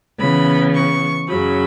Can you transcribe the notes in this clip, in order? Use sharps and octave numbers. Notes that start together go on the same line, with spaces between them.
C#3 E3 B3 B5
C#6
F#2 C#3 F#3 B5